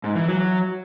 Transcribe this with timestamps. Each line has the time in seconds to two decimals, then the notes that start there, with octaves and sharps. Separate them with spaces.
0.04 G#2
0.15 E3
0.27 F#3